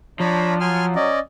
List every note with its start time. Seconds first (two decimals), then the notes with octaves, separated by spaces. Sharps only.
0.20 F3 D4 C#5 A#5 B5
0.61 F#3 G#5 C6 F6
0.95 C#4 D5 D#5